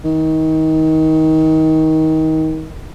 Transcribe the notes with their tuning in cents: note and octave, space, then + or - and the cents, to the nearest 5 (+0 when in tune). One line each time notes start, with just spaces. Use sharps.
D#3 +25